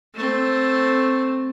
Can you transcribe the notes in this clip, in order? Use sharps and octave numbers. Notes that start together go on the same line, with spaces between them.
A3 C4